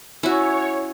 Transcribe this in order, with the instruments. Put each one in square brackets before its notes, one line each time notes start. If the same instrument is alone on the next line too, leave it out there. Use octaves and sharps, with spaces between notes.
[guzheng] C#4 [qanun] E4 F#4 [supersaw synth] C#5